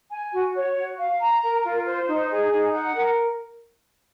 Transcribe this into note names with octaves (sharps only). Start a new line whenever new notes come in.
G#5
F#4
C#5
F#4
F5
A#5
A#4
F4
C5
D#4
G#4
D#4
F#5
A#4